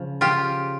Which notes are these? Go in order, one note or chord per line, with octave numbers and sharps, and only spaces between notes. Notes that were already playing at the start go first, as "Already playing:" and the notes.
Already playing: C#3 F3
F4 G4